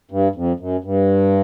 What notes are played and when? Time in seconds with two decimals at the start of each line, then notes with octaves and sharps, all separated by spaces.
0.11 G2
0.36 F2
0.60 F#2
0.84 G2